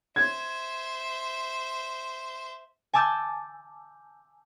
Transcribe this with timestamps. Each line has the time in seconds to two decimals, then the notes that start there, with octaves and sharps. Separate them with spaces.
0.16 C5 E5 G#6
2.94 G#5 A5 D6 E6 G6 A6